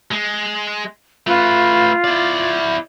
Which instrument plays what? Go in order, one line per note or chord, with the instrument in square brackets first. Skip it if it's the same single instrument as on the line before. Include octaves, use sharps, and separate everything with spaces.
[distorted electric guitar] G#3
[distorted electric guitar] A3 B4 [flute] F4
[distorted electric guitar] E4 D5